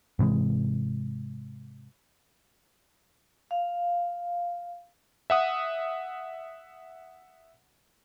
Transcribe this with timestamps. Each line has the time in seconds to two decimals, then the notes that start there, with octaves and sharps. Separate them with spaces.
0.19 G#2 C3 E3 G#3
3.51 F5
5.30 E5 F#5 D#6